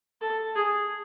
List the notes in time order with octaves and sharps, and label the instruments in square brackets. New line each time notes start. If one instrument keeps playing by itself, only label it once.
[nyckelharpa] A4
G#4